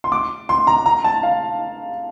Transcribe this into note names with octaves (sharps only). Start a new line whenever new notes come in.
C6
D6
C6
A#5
A#5
A5
F5